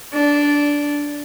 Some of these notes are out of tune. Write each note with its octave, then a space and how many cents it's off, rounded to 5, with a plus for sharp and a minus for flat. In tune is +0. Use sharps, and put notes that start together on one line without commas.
D4 -10